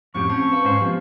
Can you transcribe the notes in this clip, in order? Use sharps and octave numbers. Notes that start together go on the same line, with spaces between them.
F2 A2 C4 C#4 G4 C#6
C4 C#4 A5
B4 F5
G#2 C#4 C5 F5
F3 B3 G4